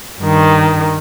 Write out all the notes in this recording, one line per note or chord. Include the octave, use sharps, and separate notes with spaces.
G2 D#3